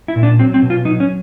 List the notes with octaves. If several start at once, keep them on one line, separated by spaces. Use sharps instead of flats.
E4
A#2
D4
F#3 C4
C4
B2
F4
F#3 D#4
C#4